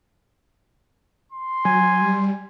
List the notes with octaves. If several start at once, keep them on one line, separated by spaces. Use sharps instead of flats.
C6
F#3 G#5
G3